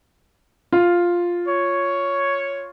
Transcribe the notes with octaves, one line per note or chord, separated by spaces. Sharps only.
F4
C#5